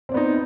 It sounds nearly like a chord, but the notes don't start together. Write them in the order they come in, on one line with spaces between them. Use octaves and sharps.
C4 D5 B3 D#4